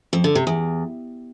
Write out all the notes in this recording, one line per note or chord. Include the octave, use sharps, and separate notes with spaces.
F2
D3
C3
E2